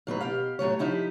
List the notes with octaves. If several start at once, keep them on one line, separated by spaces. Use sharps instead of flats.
A2 F#3 D#4 B4
B2 G4 F5
A2 F#3 A3 C#5
F3 D#4 E4 G4